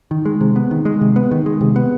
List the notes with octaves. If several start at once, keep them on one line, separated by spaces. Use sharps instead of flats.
D#3
G#3
C3
B3
D#3
G#3
C3
B3
D#3
G#3
C3
B3